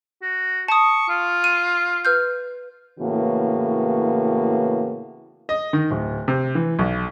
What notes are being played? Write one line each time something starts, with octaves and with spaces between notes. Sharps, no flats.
F#4
A5 C#6 D#6
F4
D#7
B4 F6 G6
A2 C#3 E3 A#3 B3 F#4
D#5
D#3
D1
C3
E3
B1